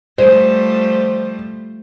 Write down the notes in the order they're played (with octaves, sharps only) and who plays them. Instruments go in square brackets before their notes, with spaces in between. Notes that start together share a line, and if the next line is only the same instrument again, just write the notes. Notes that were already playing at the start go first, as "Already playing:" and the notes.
[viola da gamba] F3 G3 A3 [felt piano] C5